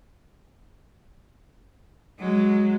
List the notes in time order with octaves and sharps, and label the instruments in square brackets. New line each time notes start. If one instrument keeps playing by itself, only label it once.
[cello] F#3 G#3